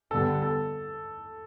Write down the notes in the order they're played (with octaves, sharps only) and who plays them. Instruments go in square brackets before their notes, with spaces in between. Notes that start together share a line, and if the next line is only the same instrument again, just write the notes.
[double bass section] G2 D3 G3 B3 [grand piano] A4
[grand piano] A4